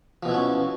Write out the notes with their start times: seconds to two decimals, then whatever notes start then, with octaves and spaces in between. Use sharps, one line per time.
0.23 F3
0.25 B2
0.28 E4
0.31 B3
0.34 C#4